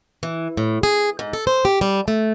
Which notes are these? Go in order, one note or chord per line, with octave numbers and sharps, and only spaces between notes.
E3
A2
G#4
G#2
A4
C5
G4
G3
A3